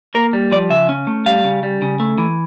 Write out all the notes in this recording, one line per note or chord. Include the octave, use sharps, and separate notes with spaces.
A#3 A#4
G3
F3 D5
C#3 E5
C#4
A3
G3 F5
C#3
G3
C#3
A3
E3